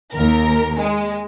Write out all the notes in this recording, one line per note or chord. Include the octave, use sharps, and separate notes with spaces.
D#2 A#4
G#3